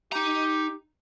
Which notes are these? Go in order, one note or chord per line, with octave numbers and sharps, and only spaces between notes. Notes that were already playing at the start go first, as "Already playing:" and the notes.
D#4 G4 A#5